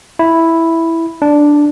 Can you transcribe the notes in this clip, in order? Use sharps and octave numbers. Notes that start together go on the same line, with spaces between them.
E4
D4